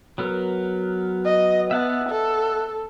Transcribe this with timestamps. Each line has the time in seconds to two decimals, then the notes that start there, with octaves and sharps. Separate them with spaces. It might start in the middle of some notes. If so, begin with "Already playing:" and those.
0.18 F#3 B3 A#4
1.25 D#5
1.71 B3 E5 F#5 A5
2.09 A4